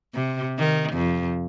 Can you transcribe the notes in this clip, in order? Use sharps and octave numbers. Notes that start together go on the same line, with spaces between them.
C3
D#3
F2